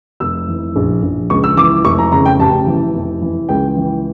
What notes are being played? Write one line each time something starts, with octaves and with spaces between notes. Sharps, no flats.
F1 E6
E3
A#1
A#1
C#2 C#6
E6
E3 D6
F1 C#6
A#5
C#3 A#5
G5
A1 A5
E3
F1
E3
C#2 G5
E3